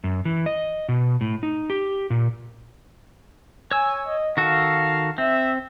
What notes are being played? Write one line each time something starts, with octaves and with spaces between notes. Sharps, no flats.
F#2
E3
D#5
B2
A2
D#4
G4
A#2
C#5 G#5 E6
D#5
D#3 F#4 A4 F5
C4 E5